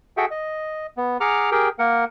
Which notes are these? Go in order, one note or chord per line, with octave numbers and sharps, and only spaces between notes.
F#4 G#4 A4 E5 F#5 G5
D#5
B3
G#4 F#5 A#5 D6 F6
G4 G#4 A#4 G5
A#3 A#4 F#5